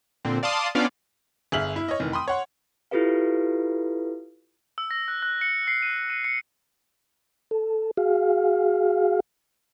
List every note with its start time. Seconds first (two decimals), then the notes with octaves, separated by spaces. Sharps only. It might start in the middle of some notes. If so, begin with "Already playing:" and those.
0.25 A#2 D3 C4
0.43 D5 F5 A5 C6 D#6
0.75 B3 C#4 D4 F4 D5 F5
1.52 G1 G#4 E5 F6 F#7
1.76 E4
1.88 C#5 D#5
2.00 F1 D#3 E3
2.12 G5 B5 C6 D#6
2.28 C#5 F#5 C6
2.91 E4 F4 G4 A4 B4 F5
4.78 E6
4.91 A#6
5.08 F#6
5.23 F#6
5.41 C#7
5.67 C7
5.82 D#7
6.10 D#7
6.24 C#7
7.51 A4
7.97 F#4 G#4 F5